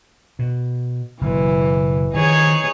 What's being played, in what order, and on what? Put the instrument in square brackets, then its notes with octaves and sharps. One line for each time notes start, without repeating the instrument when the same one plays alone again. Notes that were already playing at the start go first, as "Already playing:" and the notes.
[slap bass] B2
[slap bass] F#1 B2 [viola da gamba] E3
[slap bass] D#3 F3 [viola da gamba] D#4 G#4 C#5